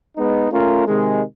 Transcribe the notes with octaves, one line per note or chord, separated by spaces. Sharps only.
G#3 B3 D#4
A3 C#4 F4 A#4
C3 D#3 G#3